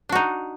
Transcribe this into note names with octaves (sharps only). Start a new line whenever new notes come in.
D4 D#4 F#4